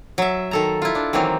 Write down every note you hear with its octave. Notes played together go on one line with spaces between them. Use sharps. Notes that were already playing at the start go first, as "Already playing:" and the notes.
F#3 E5
D#3 A4 A#5
E4 F4
D4
D#3 E3 F#3 A#3 C4